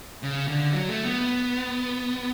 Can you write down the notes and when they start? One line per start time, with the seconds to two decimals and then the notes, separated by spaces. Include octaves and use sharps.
0.23 C#3
0.48 D3
0.73 F#3
0.89 A3
1.06 B3